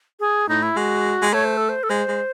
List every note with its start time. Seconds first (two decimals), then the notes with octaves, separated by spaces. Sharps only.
0.20 G#4
0.49 A2 D#4
0.63 E4
0.76 G#3 F#4
1.22 G#3
1.33 A3 C#5
1.45 C5
1.57 A4
1.69 C5
1.83 A4
1.89 G#3 C5
2.08 G#3